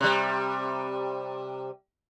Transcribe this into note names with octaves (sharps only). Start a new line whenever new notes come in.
C3 G3